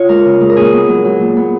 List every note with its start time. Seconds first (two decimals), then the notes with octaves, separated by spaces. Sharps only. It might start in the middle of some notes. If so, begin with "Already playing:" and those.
Already playing: F4 C#5
0.09 G#3 A#4
0.25 C#3
0.40 G#3
0.49 A#4
0.56 A#2 G#4
0.73 B3
0.89 F#3
1.05 F#3
1.21 A#2
1.37 B3